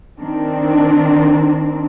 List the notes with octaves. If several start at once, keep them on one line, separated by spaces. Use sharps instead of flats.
D#3 C4 D4